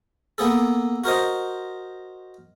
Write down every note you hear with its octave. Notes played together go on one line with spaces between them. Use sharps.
A#3 B3 G#4 A4
F#4 A#4 C5 D#5